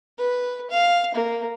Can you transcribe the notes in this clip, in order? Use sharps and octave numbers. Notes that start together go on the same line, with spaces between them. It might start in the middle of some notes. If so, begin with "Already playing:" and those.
B4
F5
A#3